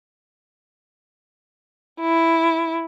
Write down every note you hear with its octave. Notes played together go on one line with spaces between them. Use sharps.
E4